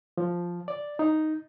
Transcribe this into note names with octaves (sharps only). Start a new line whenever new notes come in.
F3
D5
D#4